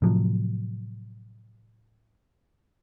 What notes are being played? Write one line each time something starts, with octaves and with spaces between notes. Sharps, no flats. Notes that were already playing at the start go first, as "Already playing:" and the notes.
A2 C3 F3 F#3